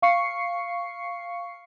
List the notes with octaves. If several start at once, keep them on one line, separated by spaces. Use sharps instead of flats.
F5 C#6 C7 C#7